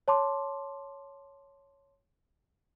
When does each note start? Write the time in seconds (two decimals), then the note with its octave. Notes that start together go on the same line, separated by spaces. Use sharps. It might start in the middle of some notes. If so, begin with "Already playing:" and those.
0.08 C#5 A5 C6 D6